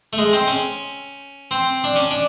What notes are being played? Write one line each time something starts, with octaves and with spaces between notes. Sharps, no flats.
A3
G#3
C4
C#4
C4
D4
C#4
D4